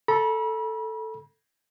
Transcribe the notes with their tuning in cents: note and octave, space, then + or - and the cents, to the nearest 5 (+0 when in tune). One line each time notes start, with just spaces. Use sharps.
A4 +0 B5 -40